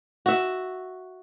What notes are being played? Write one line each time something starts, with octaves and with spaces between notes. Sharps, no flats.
F#4 E5